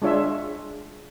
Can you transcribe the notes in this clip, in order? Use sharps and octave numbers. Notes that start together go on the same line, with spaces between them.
G#3 D4 F4 C#5 E5